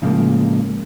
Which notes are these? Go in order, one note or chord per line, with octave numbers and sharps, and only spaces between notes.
A2 C#3 F3 G3 G#3 A#3